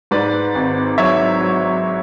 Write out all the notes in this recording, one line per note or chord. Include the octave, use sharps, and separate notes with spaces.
G#2 B4 D5
G#1
F#3 C#5 E5
F#3